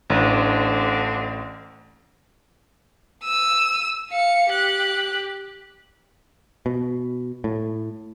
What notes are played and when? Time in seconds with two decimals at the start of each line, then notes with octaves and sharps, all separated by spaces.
0.10 A1 D3 C4 D4
3.24 E6 D#7
4.11 F5 C#7
4.50 G4 F#6
6.66 B2
7.44 A2